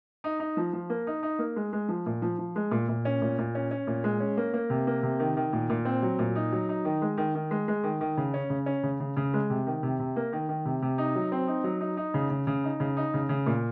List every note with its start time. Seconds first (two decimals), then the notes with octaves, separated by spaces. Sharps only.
0.24 D#4
0.40 D#4
0.57 F3
0.73 F3
0.90 A#3
1.07 D#4
1.23 D#4
1.39 A#3
1.56 G#3
1.73 G#3
1.89 F3
2.06 A#2
2.22 F3
2.39 F3
2.56 G#3
2.71 A#2
2.88 A#2
3.05 C#4
3.21 A#2
3.38 A#2
3.55 C#4
3.71 C#4
3.87 A#2
4.04 G#3
4.20 C#4
4.37 A#3
4.54 A#3
4.70 C3
4.87 A#3
5.03 C3
5.20 D#3
5.37 D#3
5.53 A#2
5.70 A#2
5.85 C4
6.02 F#3
6.19 A#2
6.35 D#4
6.52 F#3
6.69 D#4
6.85 D#3
7.02 G#3
7.17 D#3
7.35 D#3
7.51 G#3
7.68 G#3
7.84 D#3
8.01 D#3
8.17 C#3
8.34 C#4
8.50 C#3
8.66 C#4
8.83 C#3
9.00 C#3
9.17 C#3
9.34 G#3
9.50 C3
9.67 D#3
9.83 C3
9.99 C3
10.16 A#3
10.33 D#3
10.49 D#3
10.65 C3
10.82 C3
10.98 D#4
11.15 F#3
11.32 C4
11.47 D#4
11.64 F#3
11.81 D#4
11.97 D#4
12.14 C#3
12.30 C#3
12.47 C#3
12.64 D#4
12.80 C#3
12.97 D#4
13.14 C#3
13.29 C#3
13.46 A#2